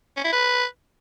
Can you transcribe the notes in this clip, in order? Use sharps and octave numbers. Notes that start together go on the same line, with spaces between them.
C#4
E4
B4